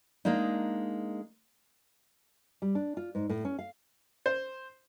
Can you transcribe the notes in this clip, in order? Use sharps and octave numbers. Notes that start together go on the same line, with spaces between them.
G#3 A#3 D4 D#4
G3
D4
F4
G#2
A2
C#4
F5
C5